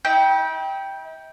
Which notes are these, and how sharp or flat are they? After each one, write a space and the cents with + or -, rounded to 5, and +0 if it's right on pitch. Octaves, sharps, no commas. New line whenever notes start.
E4 -45 G5 +0